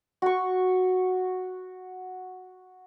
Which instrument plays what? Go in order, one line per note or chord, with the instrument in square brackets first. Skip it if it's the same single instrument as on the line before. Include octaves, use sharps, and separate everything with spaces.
[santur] F#4 C#6